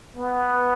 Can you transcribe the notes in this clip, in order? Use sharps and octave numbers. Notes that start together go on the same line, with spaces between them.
B3